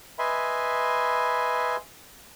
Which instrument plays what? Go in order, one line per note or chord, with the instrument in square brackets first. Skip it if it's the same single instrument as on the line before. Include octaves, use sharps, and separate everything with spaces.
[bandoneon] B4 D#5 E5 G#5 B5 C6